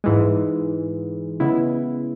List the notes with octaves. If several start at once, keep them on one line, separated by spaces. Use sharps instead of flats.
G#2 E3 G#3
C#3 G#3 B3 E4